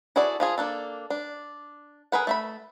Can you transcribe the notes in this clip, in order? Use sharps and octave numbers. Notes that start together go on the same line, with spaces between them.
E4 F#4 G#4 A4 D5
F3 F4 G#4
A#3 D4 A4
D4
G#4 A#4 B4 F#5
A3 E5 B5